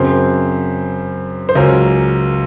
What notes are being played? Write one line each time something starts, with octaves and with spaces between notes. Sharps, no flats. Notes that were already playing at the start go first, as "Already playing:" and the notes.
Already playing: F#2 C#3 F#3 C4 C5
C5
C#2 C#3 F#3 C#4 A#4